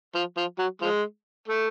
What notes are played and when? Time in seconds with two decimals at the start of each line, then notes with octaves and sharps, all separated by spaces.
0.15 F3
0.37 F3
0.59 F#3
0.82 F3 G#3
1.48 A3